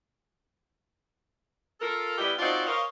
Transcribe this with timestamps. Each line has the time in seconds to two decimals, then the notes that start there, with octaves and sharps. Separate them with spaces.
1.80 F4 A4 A#4
2.18 G3 B3 E4 G4 D#5
2.39 C4 D4 D#4 F4 F#4 D5
2.65 A#4 C5 C#5 D#5 F5